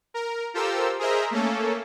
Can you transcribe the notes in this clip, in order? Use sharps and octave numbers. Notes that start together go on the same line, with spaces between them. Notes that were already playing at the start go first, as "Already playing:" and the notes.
A#4
F4 G4 A4 A#4 C5 E6
G#4 A#4 C5 D#5 E5 A#5
A3 A#3 C#4 A4